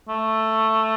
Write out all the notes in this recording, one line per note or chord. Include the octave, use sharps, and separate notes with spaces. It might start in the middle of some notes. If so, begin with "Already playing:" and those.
A3